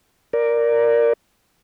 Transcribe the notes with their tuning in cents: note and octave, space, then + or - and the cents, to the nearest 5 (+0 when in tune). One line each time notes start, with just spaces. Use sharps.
A#4 +0 D5 +0